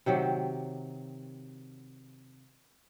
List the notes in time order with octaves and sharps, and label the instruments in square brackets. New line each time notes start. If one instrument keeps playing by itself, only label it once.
[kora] C3 D#3 F#3 G4